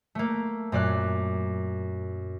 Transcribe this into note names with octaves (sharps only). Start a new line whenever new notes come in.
A3 A#3
F#2 A#2 D5 F#6